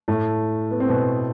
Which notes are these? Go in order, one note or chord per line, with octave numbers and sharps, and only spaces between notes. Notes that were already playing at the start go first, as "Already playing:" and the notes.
A2 A3
B3
C4
B2 B3